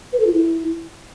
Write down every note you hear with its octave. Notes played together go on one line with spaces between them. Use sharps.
B4
A4
F4
E4